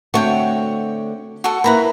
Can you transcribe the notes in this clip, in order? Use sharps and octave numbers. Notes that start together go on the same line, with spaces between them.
D3 A3 C4 F#4 C#5 G5
F#4 A4
A#3 E4 B4 A#5 B5